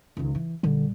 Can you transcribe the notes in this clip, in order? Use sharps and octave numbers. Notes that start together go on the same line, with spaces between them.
C#2 D#3
E3
A#1 D3 G3